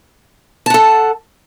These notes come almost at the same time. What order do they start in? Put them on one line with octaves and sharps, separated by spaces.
A5 F#5 A4